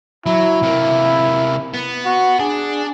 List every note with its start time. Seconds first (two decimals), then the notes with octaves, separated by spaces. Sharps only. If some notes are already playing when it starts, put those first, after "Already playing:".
0.26 F#3 E4
0.63 C3 A#3
1.74 B3
2.05 F#4
2.39 D4 G#4